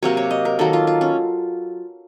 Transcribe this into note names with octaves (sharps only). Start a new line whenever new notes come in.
C3 F#3 A#3 C#5
C#5
D#5
A#4
D#3 F#3 A#3 A4
F4
F4
C#4